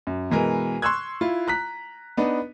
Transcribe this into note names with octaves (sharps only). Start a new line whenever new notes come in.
F#2
B2 E3 G#3 A#4
C6 C#6 E6 F#6 G#6
E4 F4
A#5 F#6 B6
B3 D4 D#4